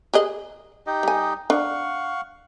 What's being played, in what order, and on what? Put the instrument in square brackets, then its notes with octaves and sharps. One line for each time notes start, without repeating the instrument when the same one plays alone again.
[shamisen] G4 G#4 D#5
[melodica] D#4 G4 D#5
[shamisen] G3 G#5
[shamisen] D4 [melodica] F5 F#5 C#6